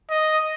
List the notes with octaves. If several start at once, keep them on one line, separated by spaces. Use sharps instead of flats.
D#5